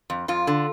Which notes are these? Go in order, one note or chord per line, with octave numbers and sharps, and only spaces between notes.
F2
F2 F4
D3